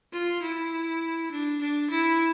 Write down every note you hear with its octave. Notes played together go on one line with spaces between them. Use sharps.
F4
E4
D4
D4
E4